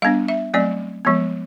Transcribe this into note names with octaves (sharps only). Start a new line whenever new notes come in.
G3 B3 D4 F5
E5
F#3 A3 C4 D5
F3 G#3 B3